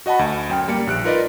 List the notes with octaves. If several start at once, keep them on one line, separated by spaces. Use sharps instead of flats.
F#4 D#5 F#5 A5 B5
D2
F#2 G5 F6
G3 A#3 C#7
A#1 F#6 D7
D#4 F4 A#4 B4 D5 D#5